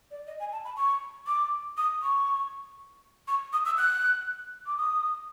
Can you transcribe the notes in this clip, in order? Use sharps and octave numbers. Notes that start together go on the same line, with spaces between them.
D5
D#5
G#5
A5
B5
C#6
D6
D#6
C#6
C#6
D#6
E6
F#6
D6
D#6